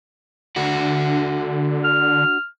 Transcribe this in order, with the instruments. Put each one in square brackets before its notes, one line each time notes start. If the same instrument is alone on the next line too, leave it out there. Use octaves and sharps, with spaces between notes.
[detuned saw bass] D3 [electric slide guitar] D4 F#4
[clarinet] F6